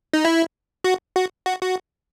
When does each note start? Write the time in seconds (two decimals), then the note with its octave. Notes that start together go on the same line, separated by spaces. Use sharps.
0.13 D#4
0.25 E4
0.84 F#4
1.16 F#4
1.46 F#4
1.62 F#4